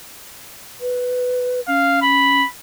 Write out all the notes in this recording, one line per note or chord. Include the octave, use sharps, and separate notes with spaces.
B4
C#4 F5
B5